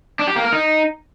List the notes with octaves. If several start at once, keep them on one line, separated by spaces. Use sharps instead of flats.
D4
G4
A#3
A#4
D#4